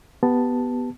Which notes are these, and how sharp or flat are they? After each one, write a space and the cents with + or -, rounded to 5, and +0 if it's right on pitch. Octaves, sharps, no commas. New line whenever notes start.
B3 +0 G4 +0 A5 +0